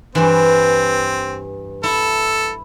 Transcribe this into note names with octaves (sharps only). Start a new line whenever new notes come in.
G2 E3 C4
E4 A4